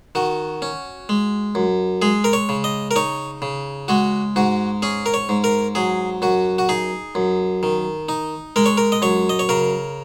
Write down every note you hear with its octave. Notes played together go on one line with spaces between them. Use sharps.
D#3 F#4
C#4
G#3
F#2
G#3 G#4
A#4
C#5
C#3
D#5
A#4
D#4 C#5
C#3
G#3 F#4
G#2 F#4
C#4 G#4
A#4
C#5
G#2
A#4
F#3 G#4
F#2 F#4
F#4
D#4 G#4
F#2
D#3
D#4
G#3 A#4
C#5
A#4
D#5
F#2 C#5
D#5
C#5
C#3 A#4